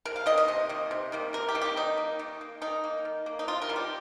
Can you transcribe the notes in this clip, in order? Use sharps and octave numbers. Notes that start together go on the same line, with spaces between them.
C3 A#4
F5
D#3 A#3 D#5
D#5
C3
D#3 A#3
C3
D#3 G3 A#3
C3 A#4
G4
D#3 G3 A#3
G4
D#3 D#4
A#3
D#3
A#3
D#3 D#4
A#3
D#3
A#3
D#4
C3 F4
A#4
D#3 G3
G4